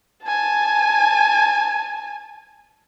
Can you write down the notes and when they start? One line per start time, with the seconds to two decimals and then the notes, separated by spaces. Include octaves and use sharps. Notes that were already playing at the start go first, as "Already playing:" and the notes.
0.25 G#5 A5